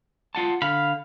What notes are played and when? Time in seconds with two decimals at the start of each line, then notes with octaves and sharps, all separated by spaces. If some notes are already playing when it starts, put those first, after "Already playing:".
0.35 F4 F#5 A5
0.62 D3 F5 B5